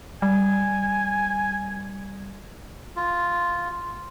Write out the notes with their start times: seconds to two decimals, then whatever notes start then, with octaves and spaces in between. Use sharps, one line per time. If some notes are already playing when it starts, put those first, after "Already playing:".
0.22 G3 G#5
2.96 F4